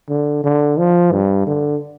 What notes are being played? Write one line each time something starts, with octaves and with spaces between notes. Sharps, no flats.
D3
D3
F3
G2
D3